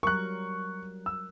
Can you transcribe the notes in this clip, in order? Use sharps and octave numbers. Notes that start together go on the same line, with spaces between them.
F#3 G3 A#4 C#6 F#6
E6